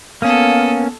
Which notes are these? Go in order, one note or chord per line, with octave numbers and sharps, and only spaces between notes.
A#3 B3 C#4 A4 F5 D#6